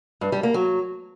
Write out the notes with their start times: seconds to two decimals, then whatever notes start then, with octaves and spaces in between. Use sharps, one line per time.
0.21 G2
0.32 G3
0.43 A#3
0.54 F#3